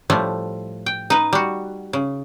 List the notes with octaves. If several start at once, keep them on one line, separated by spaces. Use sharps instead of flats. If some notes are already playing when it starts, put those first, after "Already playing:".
A2 F3 G3 A3
G5
D#4 B4
G3 F#4
C#3